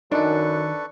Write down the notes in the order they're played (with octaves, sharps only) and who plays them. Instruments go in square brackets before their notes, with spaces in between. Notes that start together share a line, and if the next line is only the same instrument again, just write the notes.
[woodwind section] F#2 [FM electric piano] D#3 D#4 [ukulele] D4 [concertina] A4 B4 C#6